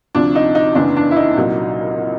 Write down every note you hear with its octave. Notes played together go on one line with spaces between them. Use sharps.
D2 C3 F3 D4
D#4
D#4
F#1 E2 C#3 E3 D4
D4
E4
D#4
C2 A#2 F#3